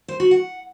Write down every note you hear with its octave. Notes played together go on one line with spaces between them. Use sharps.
C5
F#4
F#5